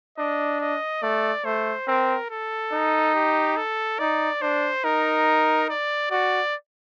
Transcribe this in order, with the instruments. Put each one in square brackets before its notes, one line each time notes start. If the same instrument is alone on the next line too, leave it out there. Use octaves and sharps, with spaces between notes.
[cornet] D4 [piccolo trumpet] D#5
[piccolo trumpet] D#5
[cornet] A3 [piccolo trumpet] D5
[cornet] A3 [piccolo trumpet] C5
[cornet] C4 [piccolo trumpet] A#4
[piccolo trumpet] A4
[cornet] D#4
[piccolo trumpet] G4
A4
[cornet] D#4 [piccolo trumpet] D5
[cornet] D4 [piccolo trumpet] C5
[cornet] D#4 [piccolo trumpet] A#4
[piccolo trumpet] D5
[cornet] F#4 [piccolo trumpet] D5